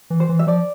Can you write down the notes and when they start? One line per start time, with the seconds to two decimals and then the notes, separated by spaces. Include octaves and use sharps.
0.10 E3
0.20 C5
0.29 E3
0.39 E5
0.47 F3 D5